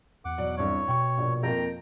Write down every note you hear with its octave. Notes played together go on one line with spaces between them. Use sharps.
E2 F#5 D6
B2 F#3 D5
C2 G2 C#5
B2 G5 C#6
A#1
F2 A#3 G5 A#5